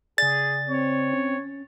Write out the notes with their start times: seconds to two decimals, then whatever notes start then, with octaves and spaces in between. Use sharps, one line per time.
0.18 C#3 G#4 D5 A6
0.68 C4 C#5
1.13 C#4